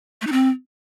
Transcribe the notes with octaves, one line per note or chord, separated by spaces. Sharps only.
A3
D#4
C4